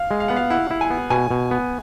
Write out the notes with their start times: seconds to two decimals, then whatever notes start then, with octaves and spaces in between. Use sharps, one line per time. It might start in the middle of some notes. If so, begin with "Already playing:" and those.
Already playing: F5
0.11 G#3
0.20 F5
0.28 B3 F#5
0.36 F5
0.50 E4 F#5
0.71 E4
0.81 G#5
0.90 B3
1.10 B2 G#5
1.31 B2
1.51 B3